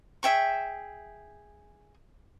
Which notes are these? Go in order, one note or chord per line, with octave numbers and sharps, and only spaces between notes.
G#4 E5 G5 C#6